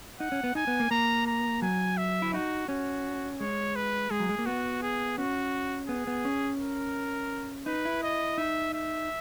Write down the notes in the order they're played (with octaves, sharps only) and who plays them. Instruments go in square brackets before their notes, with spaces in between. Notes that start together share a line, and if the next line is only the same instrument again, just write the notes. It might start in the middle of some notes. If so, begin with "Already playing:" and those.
[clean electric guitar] D#4 [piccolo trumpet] F#5
[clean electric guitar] C#4
B3
[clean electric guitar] D#4 [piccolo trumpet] G#5
[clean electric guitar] B3
A#3
[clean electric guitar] A#3 [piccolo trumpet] A#5
[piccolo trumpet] A#5
[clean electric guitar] F#3 [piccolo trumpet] G#5
[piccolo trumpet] E5
[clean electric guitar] E4
[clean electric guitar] D#4 [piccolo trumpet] F#4
[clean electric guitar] C#4 [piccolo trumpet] F#4
[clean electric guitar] G#3 [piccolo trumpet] C#5
[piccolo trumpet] B4
[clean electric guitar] G#3 [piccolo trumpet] G#4
[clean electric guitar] F#3
G#3
A#3
[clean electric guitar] B3 [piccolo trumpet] F#4
[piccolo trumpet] G#4
[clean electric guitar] C#4 [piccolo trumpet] F#4
[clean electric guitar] B3 [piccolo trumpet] G#4
[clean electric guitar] B3
C#4
[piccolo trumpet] A#4
[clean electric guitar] D#4 [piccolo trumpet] B4
[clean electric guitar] E4
[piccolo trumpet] D#5
[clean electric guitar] D#4 [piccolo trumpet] E5
[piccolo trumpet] E5